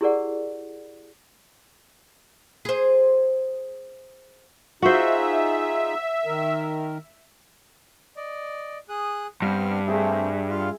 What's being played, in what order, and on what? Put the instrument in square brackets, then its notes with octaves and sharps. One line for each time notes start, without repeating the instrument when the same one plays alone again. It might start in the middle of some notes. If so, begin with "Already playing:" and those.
[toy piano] E4 G4 G#4 A#4 D5 F#5
[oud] G#4 C5
[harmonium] D#4 F4 G#4 [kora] F#4 C5 [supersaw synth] E5
[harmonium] D#3 A#4
[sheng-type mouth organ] D5 D#5
G#4 D#6 F#6
[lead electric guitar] G2 [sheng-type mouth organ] B3 C4 F6
[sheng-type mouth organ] A3 C4 [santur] G#4 E5
[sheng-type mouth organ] F4 F5